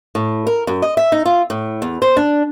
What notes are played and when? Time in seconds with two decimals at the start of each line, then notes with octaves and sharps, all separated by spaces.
0.15 A2
0.47 A#4
0.67 F#2
0.82 D#5
0.97 E5
1.12 D#4
1.26 F4
1.50 A2
1.82 E2
2.02 C5
2.17 D4